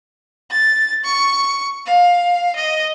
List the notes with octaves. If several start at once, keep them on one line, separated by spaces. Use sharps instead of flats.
A6
C#6
F5
D#5